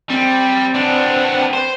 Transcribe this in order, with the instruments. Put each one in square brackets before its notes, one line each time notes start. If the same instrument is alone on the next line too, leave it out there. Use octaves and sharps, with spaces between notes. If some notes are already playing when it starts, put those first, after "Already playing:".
[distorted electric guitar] G3 [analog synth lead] C4
[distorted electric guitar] B3 D4
C5